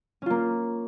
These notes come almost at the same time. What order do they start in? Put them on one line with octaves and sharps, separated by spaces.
C#4 F4 A#3